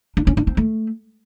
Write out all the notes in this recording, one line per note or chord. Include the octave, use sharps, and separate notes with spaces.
D4
C#4
D4
C4
A3